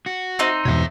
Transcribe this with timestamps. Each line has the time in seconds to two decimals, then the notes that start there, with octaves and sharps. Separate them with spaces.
0.06 F#4
0.39 C4 D#4
0.65 E2 G2 B2 C#5 E5